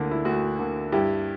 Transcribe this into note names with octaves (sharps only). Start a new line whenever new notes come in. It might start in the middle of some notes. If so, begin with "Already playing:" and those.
Already playing: D2 D3 A#3 E4
E4
D2 F#4
D3 A#3
G2 E4 G4